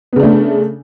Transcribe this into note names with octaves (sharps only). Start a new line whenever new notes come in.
C#3 A3 B3 D4